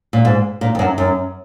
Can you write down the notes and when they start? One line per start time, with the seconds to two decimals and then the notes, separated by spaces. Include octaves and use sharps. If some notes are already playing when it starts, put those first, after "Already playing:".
0.13 A#2
0.25 G#2
0.61 A#2
0.75 F2
0.79 F#2
0.98 F#2